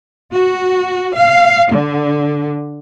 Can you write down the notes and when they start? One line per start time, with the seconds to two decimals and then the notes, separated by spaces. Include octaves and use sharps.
0.33 F#4
1.15 F5
1.72 D3